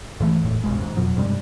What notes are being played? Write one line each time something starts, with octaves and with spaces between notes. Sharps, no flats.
G#2 E3 A3
E1 A2
F#1 B1 G#3
D#2 G#2
F2 B2 F3 F#3
G2 C3 G3 G#3